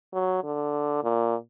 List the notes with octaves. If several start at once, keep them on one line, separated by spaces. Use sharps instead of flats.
F#3
D3
A#2